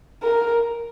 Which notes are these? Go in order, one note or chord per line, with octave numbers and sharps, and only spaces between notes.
A#4